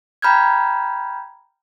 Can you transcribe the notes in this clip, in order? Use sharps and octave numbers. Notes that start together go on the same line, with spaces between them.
G5 A#5 B5 F6 G6 G#6